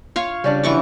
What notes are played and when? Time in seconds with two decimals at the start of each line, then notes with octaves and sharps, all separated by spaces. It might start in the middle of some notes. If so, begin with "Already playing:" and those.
0.16 F4 C#5 F5
0.44 C#3 G3 C#4 D4 D5
0.64 E3 F3 E4 F#4 C#6 D6